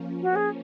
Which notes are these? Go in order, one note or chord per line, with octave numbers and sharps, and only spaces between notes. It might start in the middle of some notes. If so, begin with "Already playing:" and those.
Already playing: F3 A#3 C#4
F#4
G#4